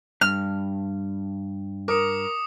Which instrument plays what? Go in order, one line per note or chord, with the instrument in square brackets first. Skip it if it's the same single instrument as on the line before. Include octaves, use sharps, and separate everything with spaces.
[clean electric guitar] G2 [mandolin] F6
[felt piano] A#4 [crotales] D6 D#6 C#7